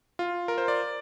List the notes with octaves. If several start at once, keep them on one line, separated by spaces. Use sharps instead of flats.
F4
A#4
C5
D5